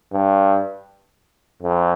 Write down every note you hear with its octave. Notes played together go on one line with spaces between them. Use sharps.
G2
F2